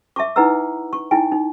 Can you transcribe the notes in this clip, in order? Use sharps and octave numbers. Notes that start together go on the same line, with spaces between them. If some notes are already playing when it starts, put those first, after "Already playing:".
E5 A5 C#6 D6
D#4 E4 B4 F#5 A#5 E6
C#6
D#4 E4 G5 G#5
D#4